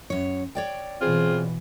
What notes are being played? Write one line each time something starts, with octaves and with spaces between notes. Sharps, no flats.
F#2 C#5
C#5 D5 G5
B2 E3 C4 F4 G#4